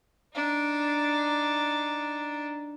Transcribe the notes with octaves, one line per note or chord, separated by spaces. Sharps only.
D4 D#4